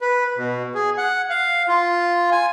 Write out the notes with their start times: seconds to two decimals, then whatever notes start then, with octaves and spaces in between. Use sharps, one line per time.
0.01 B4
0.37 B2
0.75 G#4
0.98 F#5
1.30 F5
1.68 F4
2.32 G#5